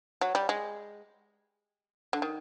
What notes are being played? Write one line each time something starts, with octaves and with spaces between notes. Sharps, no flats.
F#3
G3
G#3
D3
D#3